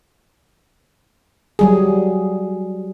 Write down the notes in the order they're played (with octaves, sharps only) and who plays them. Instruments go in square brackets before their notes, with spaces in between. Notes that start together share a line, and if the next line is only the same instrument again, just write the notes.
[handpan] F#3 G3 G#4